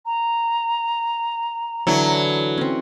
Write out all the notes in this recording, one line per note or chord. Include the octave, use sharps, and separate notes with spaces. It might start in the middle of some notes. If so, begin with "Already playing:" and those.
A#5
D3 E3 F#3 E4
C4 C#4